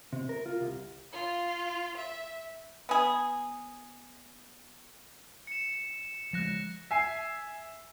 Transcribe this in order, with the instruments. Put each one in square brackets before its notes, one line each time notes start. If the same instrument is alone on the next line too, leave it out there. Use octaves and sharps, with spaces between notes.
[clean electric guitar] C3
A#4
F4
C2
[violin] F4
E5
[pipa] B3 G#4
[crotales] C#7 E7
[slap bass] F3 G#3 [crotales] F#6 A#6 E7
[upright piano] E5 G#5 C7